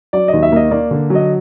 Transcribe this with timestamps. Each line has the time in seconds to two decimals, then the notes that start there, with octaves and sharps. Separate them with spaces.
0.13 F#3 D5
0.28 D#2 D#5
0.43 E5
0.52 A#3 D#5
0.71 A#3 D5
0.91 D3
1.10 F#3
1.15 D#5